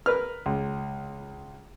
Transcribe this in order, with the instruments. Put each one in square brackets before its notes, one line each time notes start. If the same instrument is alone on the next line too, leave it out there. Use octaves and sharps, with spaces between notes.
[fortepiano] A#4 B4 F6
C#2